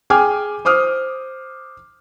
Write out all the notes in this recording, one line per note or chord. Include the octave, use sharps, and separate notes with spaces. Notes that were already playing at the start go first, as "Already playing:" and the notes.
G#4 G5 G#5 D6 F6
C5 D6 D#6 F6